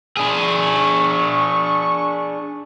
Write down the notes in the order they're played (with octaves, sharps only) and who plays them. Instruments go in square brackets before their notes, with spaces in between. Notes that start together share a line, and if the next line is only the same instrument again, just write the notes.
[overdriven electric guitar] D4 G#4
[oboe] C#6